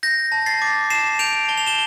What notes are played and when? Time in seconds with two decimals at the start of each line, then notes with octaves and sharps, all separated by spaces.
0.03 G6 A#6
0.32 A5
0.46 A6 C7
0.62 D6
0.90 A5 C7 E7
1.19 G6 D7 F7
1.48 A5 G7
1.58 F7
1.67 E7 G7